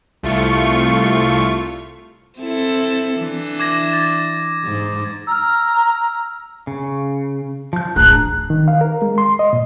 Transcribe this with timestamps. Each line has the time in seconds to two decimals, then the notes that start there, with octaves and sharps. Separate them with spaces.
0.23 C2 A3 F4 C#6
2.39 C4 E4 A4
3.17 E3 D4
3.60 D6 G#6 A#6
3.93 A6
4.64 G#2
5.27 A#5 E6 F6
6.67 C#3
7.73 F3 G6
7.96 D1 A1 D4 G#4 A#5 F#6
8.50 D#3
8.68 F5
8.81 A#4
9.02 G#3
9.18 C6
9.39 D#5
9.53 A#2